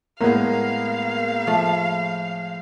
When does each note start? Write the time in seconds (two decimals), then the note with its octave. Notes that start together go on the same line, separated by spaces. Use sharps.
0.21 A2 G#3 A#3 B3 F5
1.47 F3 A3